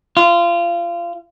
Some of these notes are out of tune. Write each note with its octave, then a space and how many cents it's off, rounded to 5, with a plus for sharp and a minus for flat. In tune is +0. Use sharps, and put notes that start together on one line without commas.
F4 -25